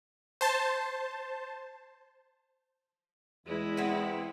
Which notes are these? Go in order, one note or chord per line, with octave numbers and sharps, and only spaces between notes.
C5 A5
E2 G#3 E4
B3 C4